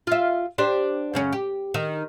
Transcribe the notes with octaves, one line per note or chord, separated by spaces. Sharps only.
F4 E5
D4 G4 C5
F#2 C#3 C#4
G4
D#3